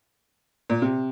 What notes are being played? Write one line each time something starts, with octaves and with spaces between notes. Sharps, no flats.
A#2
C3